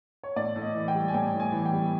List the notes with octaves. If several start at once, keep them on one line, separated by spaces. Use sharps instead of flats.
C#5
A2 D5
A2
D#5
E3
G5
G3
G#5
A2 G5
A2
G#5
E3
G5
G3